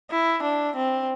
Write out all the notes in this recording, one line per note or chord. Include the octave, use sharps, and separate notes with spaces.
E4
D4
C4